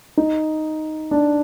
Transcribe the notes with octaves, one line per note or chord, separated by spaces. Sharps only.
D#4
D4